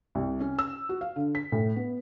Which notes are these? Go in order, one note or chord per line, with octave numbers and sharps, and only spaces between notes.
C2
C#4
E6
F#4
F5
D3
B6
A2
B3